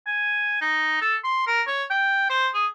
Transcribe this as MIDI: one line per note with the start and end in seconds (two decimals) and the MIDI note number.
0.07 0.61 80
0.61 0.98 63
1.01 1.16 69
1.24 1.44 84
1.47 1.62 70
1.67 1.84 73
1.90 2.26 79
2.30 2.48 72
2.54 2.66 68